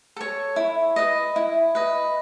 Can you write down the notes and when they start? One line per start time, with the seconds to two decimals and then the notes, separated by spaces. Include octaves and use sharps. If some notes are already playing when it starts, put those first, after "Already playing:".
0.16 A4 C#5
0.56 E4
0.96 B4 D#5
1.36 E4
1.75 B4 D#5